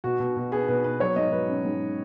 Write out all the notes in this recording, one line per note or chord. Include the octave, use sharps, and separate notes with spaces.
B2 F#4
B2
B2
B3 G#4
B2 B4
B3 B4
F#3 C#5
G#2 D#5
F#3 B4
C#4
G#2